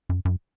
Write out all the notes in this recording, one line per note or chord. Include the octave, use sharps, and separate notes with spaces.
F#2
F#2